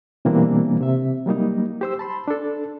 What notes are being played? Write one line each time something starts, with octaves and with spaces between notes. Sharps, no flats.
B2 E3 G3 A#3 C4 D4
C3 E5
F#3 G3 A#3 D#4
G4 C5 E6
A5 B5 C6
D4 A4